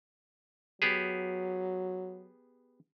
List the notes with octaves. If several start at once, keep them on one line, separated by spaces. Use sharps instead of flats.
F#3 B3 G4 G#4